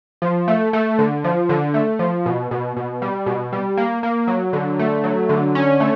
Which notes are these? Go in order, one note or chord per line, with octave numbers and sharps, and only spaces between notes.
F3
A3
A3
D3
F3
D3
A3
F3
B2
B2
B2
G3
B2
G3
A#3
A#3
F#3
D3
A3
F#3
D3
C#4
A3